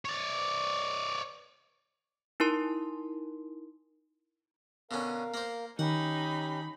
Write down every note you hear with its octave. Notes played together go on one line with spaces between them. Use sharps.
C#5 D5
D#4 E4 A#4 C6
B2 D3 C#4 A#4 F5
A#3 C5
D#3 C#4 D#4 G4 F#5 B5